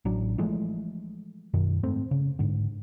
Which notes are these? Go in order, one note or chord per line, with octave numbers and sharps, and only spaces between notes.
A1 F#3 D4
E3 F3 G#3 A3
F#2 B2 D#3
G#2 A3 C4
C#3
G#2 D3